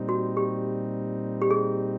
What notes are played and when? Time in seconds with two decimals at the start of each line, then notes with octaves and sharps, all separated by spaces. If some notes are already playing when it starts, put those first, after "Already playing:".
Already playing: A#2 G3 C4 D#4
0.09 F#4
0.37 G4
1.42 G4
1.51 G#4